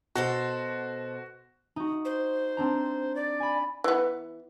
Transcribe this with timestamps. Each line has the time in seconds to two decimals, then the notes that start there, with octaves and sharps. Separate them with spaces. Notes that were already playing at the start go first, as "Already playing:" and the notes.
0.15 B2 F#4 A4 C5
1.76 D#4 F#4
2.05 C5
2.57 C4 D4 A#5
3.16 D5
3.40 G#5 B5
3.84 E3 B3